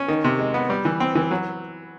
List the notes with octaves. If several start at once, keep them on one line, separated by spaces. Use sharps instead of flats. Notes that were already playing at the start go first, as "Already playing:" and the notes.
Already playing: C#4
D#3
C3
G#3
B3
G3
E3
C4
E3
F#3